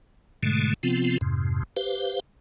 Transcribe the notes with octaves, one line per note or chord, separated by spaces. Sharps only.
G#2 B2 D3 G#3 A3
C3 F3 B3 C4 F4
F2 G#2 C3
G4 B4 C5 F5